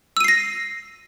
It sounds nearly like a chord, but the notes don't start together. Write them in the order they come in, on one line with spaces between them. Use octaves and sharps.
E6 D#7 C7 A#6